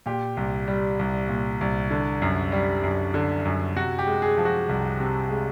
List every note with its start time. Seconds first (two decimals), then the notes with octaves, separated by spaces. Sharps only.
0.06 A#2 G4
0.37 C2
0.68 G3
0.99 C2
1.29 A#2
1.61 C2
1.91 D3
2.22 F#2
2.52 G3
2.84 F#2
3.14 D3
3.45 F#2
3.75 C3 F#4
3.99 G4
4.07 G#3
4.22 G#4
4.38 F3
4.45 F#4
4.69 C2
5.00 C3
5.30 G#3